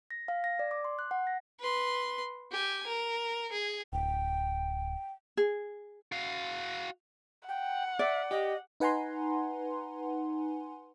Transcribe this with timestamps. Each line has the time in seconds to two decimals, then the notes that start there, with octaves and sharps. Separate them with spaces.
0.11 A#6
0.28 F5
0.44 A#6
0.59 D5
0.71 D6
0.85 C6
0.99 F#6
1.11 F#5
1.27 A#6
1.59 B4 C6
2.51 G4 G#5
2.87 A#4
3.52 G#4
3.93 D1 G5
5.37 G#4
6.12 F#4 F5
7.49 F#5 G5
7.99 D5 E5
8.31 G4 D#5
8.80 D#4 B4 F#5 G#5 A#5 C6